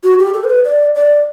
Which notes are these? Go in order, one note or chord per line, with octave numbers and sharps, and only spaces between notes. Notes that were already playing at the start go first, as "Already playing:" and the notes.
F#4
G4
A4
C5
B4
D5
D5